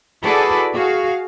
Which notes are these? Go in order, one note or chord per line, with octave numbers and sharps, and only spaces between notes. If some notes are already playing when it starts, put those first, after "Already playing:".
E4 F#4 G#4 A4 B4 D5
F#4 G#4 F5